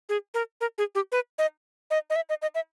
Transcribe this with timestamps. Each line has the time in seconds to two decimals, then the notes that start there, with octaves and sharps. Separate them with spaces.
0.09 G#4
0.34 A#4
0.61 A#4
0.78 G#4
0.95 G4
1.12 B4
1.38 D#5
1.91 D#5
2.10 D#5
2.16 E5
2.29 D#5
2.42 D#5
2.55 E5